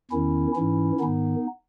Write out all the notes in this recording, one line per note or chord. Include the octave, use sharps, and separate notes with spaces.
E2 D#3 C#4 E4
G#2 E3 C#4 E4
G#2 D#3 B3 D#4